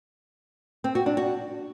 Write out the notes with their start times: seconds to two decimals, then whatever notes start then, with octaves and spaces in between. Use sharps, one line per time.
0.84 C4
0.95 F#4
1.06 D4
1.17 F#4